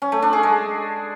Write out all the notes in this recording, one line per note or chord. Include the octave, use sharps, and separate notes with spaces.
C#4
A3
D4
G#4
G#3